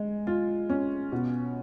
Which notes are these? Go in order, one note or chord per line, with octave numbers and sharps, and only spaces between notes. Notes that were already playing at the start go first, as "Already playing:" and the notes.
Already playing: G#3
F4
C#4
B2